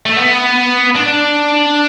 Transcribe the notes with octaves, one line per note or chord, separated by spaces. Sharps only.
A3
B3
D4